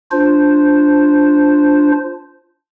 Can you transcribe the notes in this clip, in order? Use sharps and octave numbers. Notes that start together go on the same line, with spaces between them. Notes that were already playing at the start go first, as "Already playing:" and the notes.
D4 F4 C5